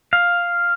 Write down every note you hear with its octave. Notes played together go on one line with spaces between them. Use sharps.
F5